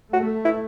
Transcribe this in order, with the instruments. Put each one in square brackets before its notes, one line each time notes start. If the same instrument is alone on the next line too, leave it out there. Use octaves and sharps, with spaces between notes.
[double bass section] A3 [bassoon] F#4
[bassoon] E4